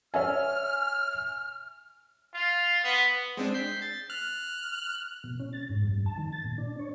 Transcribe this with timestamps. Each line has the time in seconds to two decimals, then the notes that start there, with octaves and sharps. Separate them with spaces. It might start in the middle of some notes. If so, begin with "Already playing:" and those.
0.14 C#5 E5 G#5 F6
2.34 F4
2.84 B3
3.37 G#3 C4 D4
3.54 G6 B6 C7
3.82 A6
4.10 F6 F#6
5.24 B2
5.40 C#4
5.53 A6
5.69 G#2
5.87 G2
6.06 A5
6.18 D#3
6.32 A6
6.45 A#2
6.58 D4
6.79 C#5